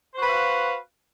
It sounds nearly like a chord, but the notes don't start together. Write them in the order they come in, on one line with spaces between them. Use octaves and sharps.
C5 F#4 B4 F5